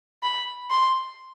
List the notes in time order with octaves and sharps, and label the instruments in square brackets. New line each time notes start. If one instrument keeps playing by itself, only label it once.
[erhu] B5
C6